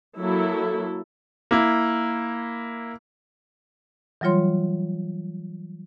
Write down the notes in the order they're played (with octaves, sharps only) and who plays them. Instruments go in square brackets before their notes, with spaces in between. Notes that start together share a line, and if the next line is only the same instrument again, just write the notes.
[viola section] F#3 A#3 E4 A4
[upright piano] A#3 E4
[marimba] E3 F#3 G3 F4 C#5 C6